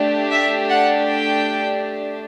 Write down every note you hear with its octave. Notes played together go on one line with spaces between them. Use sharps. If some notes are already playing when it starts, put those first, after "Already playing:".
Already playing: A3 D4 G4
E5
F#5
G5